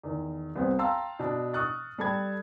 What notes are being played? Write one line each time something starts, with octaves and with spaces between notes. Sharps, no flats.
E2 D#3
C2 B3 C4
F5 G5 A5 A#5 C6 E6
B2 D4
C#6 D#6 F6 F#6 A6
G3 G4 A4 A5 B5 G#6